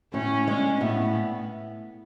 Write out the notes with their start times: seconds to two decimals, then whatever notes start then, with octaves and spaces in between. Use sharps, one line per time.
0.13 A2 C#4
0.47 G#3 C#4 D4
0.81 A2 B3